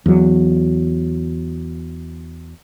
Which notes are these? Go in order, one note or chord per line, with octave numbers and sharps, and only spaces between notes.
E2 F#3